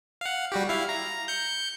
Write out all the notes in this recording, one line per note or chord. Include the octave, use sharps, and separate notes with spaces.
F5 F#5
G3 F#4 G4
E4 F5
A#5
G6 C#7